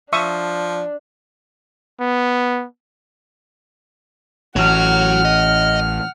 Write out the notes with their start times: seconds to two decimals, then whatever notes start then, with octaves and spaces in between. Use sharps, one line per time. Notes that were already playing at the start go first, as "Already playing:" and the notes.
0.13 F3 D4 E5 C#6 D#6
2.00 B3
4.56 A1 F#4 C#5 F#5 F6
5.25 D#5